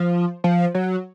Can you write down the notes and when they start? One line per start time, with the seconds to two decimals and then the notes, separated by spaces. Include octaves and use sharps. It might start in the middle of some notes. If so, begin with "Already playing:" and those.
Already playing: F3
0.44 F3
0.74 F#3